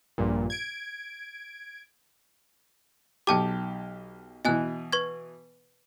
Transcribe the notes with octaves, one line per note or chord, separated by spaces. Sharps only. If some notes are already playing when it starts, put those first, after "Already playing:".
A#1 G2 A#2
G#6 D7
B1 G4 G5 A5 D6
B2 E3 D#5 G#5 F#6
B4 C#6 G#6